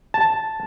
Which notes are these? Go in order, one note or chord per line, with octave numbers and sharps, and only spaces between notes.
A5